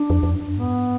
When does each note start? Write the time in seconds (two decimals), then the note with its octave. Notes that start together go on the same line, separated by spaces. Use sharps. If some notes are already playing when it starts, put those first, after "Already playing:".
Already playing: D4
0.10 F2
0.23 F2
0.34 F#2
0.56 G#2 B3